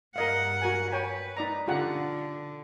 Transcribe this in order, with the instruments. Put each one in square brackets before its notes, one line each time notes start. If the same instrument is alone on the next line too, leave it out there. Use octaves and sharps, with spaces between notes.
[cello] G2 F#5 [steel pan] A#4 D#5 F5
[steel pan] F#4 A#4 G#5
[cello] B4 [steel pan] C#5 G5 G#5
[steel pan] D#4 D5 A#5
[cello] D3 [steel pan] F4 G4 F#5